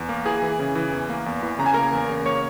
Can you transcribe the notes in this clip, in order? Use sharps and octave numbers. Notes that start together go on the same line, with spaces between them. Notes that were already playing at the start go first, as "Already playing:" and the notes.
Already playing: E2
A#3
E3 G#4 G#5
E3
C#3
E3
E2
A#3
E2
E3
C#3 A#5
G#5
A#3 A#4 A#5
E2
C#3
A#3 C#5 C#6